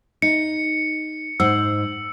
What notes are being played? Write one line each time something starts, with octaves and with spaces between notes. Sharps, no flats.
D#4 C#7
G#2 C5 F#5 E6